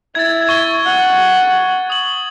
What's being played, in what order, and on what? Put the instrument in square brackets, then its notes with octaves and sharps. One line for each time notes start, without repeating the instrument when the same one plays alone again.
[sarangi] E4 [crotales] G#6 A6
[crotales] C#6 G7
[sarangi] F#5
[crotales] D#6 F#7